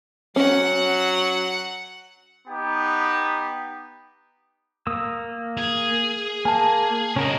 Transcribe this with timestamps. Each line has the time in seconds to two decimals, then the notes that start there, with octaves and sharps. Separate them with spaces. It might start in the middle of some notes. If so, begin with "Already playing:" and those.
0.36 F#3 C#4 F#5
2.48 B3 D#4 G4
4.87 A#3 D#6 E6
5.57 G#4
6.45 A#3 G#5 A5
7.16 C#2 C#4 F#4 A#4 D#5